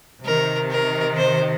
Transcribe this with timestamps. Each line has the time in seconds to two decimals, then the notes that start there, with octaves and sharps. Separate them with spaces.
0.25 C3 D#3 A#4
0.71 A#4
1.17 C5